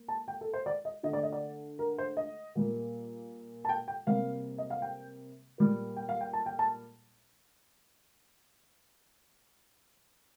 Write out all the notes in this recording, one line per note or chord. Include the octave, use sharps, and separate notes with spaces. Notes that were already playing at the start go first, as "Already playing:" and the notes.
Already playing: A#3
A5
G5
A4
C5
D5
D#5
D3 A3 D#5
D5
D#5
D5
A#4
C5
D#5
A#2 G3 A#3
A5
G5
G5
C3 G3 A#3 F5
D#5
F5
G5
A#2 G3 A#3
G5
F5
G5
A5
G5
A5